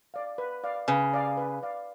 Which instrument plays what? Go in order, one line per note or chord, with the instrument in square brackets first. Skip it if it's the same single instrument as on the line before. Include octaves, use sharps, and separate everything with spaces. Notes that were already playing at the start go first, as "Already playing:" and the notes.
[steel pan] D5 F5
B4
D5 F5
[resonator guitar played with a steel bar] C#3 [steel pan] B4
[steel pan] D5 F5
B4
D5 F5